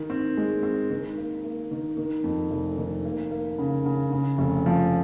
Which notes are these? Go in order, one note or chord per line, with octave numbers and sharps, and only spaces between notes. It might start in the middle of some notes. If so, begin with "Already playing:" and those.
Already playing: D#3
C4
G#3
C4
D#3
A#3
A#3
D#3
D#3
F2
F1
D#3
A#3
A#3
C#3
C#3
C#3
F1
F3